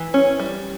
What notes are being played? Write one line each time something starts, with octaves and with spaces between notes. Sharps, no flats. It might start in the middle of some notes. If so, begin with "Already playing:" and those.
Already playing: E3
C#4
G3